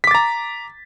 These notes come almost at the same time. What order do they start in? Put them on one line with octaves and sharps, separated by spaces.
B6 D6 A6 A#5